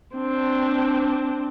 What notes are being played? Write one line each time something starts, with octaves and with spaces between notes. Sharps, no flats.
C4 D4